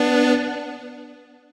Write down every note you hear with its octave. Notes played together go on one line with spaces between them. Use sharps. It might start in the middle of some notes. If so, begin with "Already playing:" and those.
Already playing: B3 D4